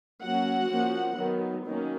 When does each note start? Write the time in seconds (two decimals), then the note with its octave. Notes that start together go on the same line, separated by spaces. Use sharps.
0.22 F#3 A#3 C#4 F#4 F#5
0.70 F3 A#3 C#4
1.17 D#3 F#3 B3
1.65 D#3 F#3 A#3 C#4